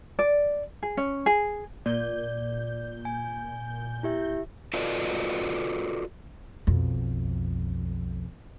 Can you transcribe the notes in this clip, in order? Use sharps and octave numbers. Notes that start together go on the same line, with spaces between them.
D5
G#4
C#4
G#4
A#2 D5 G6
G#5
E4 G4 E5
F4 F#4 A4 B4 D5 D#5
B1 F2